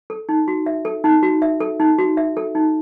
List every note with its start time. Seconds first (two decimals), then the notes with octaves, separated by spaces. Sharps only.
0.10 A4
0.29 D#4
0.48 F#4
0.66 E5
0.85 A4
1.04 D#4
1.23 F#4
1.42 E5
1.60 A4
1.80 D#4
1.98 F#4
2.17 E5
2.37 A4
2.55 D#4